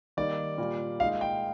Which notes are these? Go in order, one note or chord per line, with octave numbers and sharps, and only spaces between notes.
D#3 G3 A#3 D#4 D5
A#2 G3 A#3 F4
A#2 G#3 D#4 F5
G5